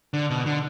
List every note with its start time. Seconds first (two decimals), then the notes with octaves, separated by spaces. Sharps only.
0.14 D3
0.30 B2
0.46 D3